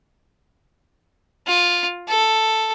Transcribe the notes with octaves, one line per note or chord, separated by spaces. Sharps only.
F4
A4